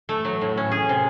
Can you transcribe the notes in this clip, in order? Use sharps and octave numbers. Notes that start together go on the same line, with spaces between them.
A3
F#3
A2
C#4
G#4
C3